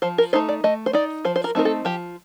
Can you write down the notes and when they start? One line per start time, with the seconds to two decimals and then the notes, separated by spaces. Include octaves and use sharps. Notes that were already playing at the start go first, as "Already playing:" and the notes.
0.02 F3 C5
0.18 A#4
0.33 A3 D#4 C5
0.49 D5
0.64 A3 D#5
0.86 C5
0.93 D#4 D5
1.25 F3 C5
1.36 C5
1.44 A#4
1.55 A3 C4 D#4 A#4
1.65 A4
1.85 F3 G4